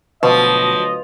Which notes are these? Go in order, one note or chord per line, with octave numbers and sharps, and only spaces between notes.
D2 B2 F3 F#3 B4 D#5